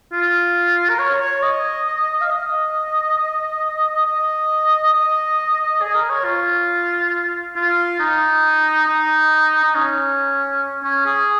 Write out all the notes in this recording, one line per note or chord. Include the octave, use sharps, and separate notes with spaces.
F4
A#4
C#5
C#5
D#5
F5
D#5
D#5
D#5
G#4
A#4
C#5
F4
F4
D#4
D#4
D#4
C#4
C#4
G#4